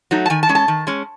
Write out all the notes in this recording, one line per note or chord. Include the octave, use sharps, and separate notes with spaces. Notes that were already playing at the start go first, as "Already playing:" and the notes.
F#3 A3 D#4
A5
D#3 G#5
A5
G#3 C#4
A5
D#3
G#3 C#4